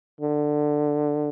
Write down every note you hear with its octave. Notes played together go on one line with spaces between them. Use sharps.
D3